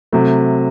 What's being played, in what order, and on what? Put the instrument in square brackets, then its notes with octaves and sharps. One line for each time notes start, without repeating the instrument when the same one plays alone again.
[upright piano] C3 F#3 A3